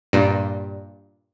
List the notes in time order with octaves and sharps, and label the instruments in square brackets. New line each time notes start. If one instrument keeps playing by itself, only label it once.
[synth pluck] G2 A#2